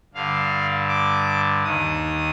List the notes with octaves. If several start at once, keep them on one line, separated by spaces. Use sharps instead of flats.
G2 D3 F5
D6
D#2 D#3 D#6